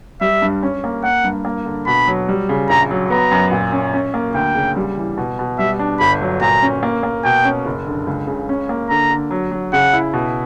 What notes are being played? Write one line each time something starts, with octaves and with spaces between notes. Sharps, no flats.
G3 E5
G2
C#4
A#3
A#3 F#5
G2
A#3
D3
B2 B5
F#3
G3
C#3
A#1 A#5
F#3
B3 A#5
F#2
A#2
C#4
C#4
A#3
D2 G5
C#3
G3
E3
B2
B2
G3 E5
D4
G1 B5
F#3
A#2 A#5
C#4
A#3
A#3
B2 G5
C#4
F#1
D3
C#2
C#3
C#4
A#3
D3 A#5
D3
F#3
F#3
C#3 F#5
E4
B2